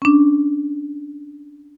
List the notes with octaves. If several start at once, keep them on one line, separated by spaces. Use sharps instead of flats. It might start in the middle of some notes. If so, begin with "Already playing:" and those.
C#4 D4